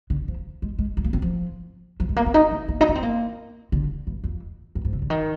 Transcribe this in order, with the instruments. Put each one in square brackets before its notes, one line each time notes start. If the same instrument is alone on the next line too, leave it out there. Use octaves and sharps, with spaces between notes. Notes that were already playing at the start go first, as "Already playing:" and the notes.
[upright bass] D3
F3
G#3
G#3
G#3
A#3
C4
F3
F3
G#3
A#3
C4
D#4
D4
A#3
D#4
D4
C4
A#3
D3
G2
F2
G2
G#2
C3
D3
D#3